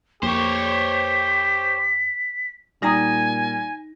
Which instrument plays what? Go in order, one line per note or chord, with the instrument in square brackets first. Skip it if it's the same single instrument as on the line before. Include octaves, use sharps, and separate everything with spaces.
[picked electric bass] F2 A#3 [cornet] G4 [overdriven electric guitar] C5 C#5 [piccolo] B6
[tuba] A#2 [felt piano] G3 A#6 [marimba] D#4 A#5 D#6 [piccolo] G#5